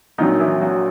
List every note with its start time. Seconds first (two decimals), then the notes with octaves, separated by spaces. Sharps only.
0.18 A#1 A#2 D#3 F#3 D#4
0.40 E3 E4
0.61 F#3 F#4